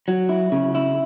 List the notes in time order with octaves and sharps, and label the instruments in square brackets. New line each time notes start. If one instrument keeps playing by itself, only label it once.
[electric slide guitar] F#3
E4
C#3
E4